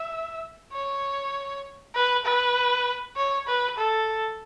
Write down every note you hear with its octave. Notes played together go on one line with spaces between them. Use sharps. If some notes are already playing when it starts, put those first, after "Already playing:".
Already playing: E5
C#5
B4
B4
C#5
B4
A4